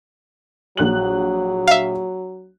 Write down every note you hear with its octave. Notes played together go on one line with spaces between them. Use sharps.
A#1 F#3 F#6 F#7
E5 F5